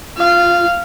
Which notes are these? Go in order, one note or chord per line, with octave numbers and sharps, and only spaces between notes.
F4 F5